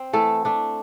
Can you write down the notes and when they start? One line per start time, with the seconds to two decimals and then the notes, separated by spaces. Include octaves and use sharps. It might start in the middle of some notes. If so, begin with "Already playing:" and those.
Already playing: C4
0.13 E3 A3 A4
0.45 A3 D4